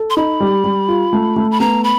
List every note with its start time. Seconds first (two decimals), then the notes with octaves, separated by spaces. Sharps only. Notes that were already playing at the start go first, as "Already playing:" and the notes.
Already playing: A4
0.10 C6
0.17 D#4 B5
0.40 G3
0.64 G3
0.88 F4
1.13 A3
1.36 A3
1.51 B5
1.60 B3 A#5
1.84 B5